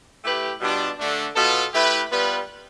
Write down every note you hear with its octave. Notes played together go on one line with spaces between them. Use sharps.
A3 E4 G4 B4
B2 G3 D4 F4
D3 A3 D4
B2 B3 F4 A4
A3 E4 G4 B4
G3 B3 F4 B4